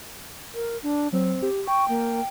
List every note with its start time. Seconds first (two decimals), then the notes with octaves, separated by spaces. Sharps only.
0.54 A#4
0.83 D4
1.13 F#3 C4
1.42 G4
1.68 G5 C#6
1.89 A#3 G5